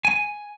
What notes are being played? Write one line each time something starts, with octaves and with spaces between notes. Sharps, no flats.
G#5